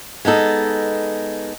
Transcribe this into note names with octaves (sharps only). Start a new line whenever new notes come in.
G#3 B3 D#4 A4